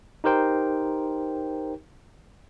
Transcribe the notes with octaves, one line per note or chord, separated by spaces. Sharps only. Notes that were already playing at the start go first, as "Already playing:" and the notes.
D#4 G4 A#4 C5 G5